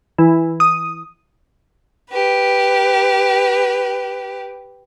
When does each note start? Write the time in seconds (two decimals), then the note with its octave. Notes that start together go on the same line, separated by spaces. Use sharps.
0.18 E3
0.60 D#6
2.10 G4 B4